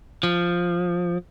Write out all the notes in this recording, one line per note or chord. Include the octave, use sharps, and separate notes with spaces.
F3